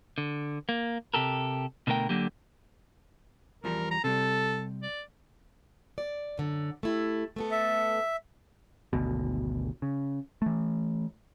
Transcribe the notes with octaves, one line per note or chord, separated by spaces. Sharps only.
D3
A#3
C3 G4 A4 A#4
B2 D3 A3 A#4 G5
D3 F#3 A#3 G4
E2 F3 G3 A#4
A#5
C3 G3 A4
D5
D5
F#2 D3
A3 E4 G4
A3 B3 A4
E5
G#1 D2 B2
C#3
E3 A3